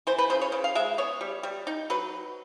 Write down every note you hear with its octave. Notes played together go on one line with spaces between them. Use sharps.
E3 C5
B4
C#3 C5
C#5
C#3
F5
G#3 E5
B3 C#5
G3
G3
D#4
F#3 B4